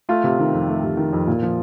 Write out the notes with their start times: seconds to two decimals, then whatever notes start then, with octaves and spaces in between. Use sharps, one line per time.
0.09 A3 F4
0.24 C3
0.39 D#3
0.53 F2
0.68 A3
0.83 C3
0.97 D#3
1.13 F2
1.27 A#2
1.42 F3